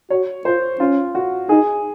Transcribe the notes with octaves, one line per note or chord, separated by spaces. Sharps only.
F#4 C#5
F4 C5
C#4 F4
F#4
D#4 G#4